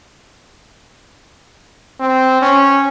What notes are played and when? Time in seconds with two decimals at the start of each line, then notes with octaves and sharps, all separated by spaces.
2.00 C4
2.42 C#4